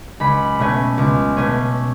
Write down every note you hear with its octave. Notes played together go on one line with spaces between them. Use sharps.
C#2 B5
B2 A3 C#4
C#2
B2 A3 C#4